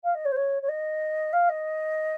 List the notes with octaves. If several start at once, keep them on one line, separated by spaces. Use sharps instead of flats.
F5
D#5
C#5
C5
C#5
C#5
D#5
F5
D#5